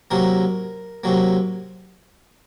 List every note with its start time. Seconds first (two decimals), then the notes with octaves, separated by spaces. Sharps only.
0.11 C3 F#3 A#3 A#4
1.04 C3 F#3 A#3